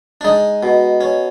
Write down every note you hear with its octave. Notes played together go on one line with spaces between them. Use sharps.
D4
G#3 D#4
B2
C#4